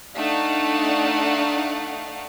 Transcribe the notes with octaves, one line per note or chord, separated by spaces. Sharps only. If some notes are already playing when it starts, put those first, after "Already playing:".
A3 D4 D#4 F5 F#5